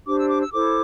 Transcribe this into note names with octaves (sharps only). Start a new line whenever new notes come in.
D4 G4 C5 D6
E6
D6
E6
E4 A4 C5 D6